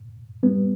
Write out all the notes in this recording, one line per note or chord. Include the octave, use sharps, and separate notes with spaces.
G3 B3